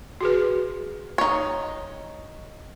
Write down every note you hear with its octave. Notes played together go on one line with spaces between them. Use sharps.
F#4 G#4 B4
D#4 C#5